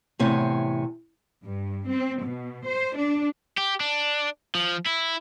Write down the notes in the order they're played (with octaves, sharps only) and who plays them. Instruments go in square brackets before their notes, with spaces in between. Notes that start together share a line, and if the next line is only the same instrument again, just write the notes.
[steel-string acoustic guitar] E2 A2 C3 C#5 G#5
[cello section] G2
C4
B2
C5
D4
[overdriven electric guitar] G4
D4
F3
E4